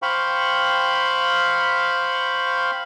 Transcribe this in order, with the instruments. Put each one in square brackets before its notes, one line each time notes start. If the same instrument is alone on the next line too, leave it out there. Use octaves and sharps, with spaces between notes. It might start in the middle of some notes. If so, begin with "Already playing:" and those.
[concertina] C5 F5 G5 B5 C#6